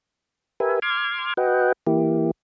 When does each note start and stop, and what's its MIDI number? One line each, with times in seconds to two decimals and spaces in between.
0.60 0.79 67
0.60 0.79 70
0.60 0.79 71
0.60 0.79 76
0.60 0.79 80
0.82 1.34 84
0.82 1.34 86
0.82 1.34 89
0.82 1.34 92
1.37 1.72 66
1.37 1.72 71
1.37 1.72 75
1.37 1.72 78
1.37 1.72 79
1.87 2.31 52
1.87 2.31 58
1.87 2.31 64
1.87 2.31 67